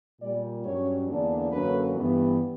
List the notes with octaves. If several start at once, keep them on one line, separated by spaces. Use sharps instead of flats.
A#2 G3 A#3 D5
G2 F#3 C#4 C#5
E2 D3 A#3 D4
F#2 D3 F#3 A#3 C#4 B4
G2 E3 B3